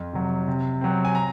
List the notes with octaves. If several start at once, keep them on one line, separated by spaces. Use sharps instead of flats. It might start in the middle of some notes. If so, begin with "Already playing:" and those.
Already playing: F2
C3 F#3
C3
F#3 C4
G#5
A#5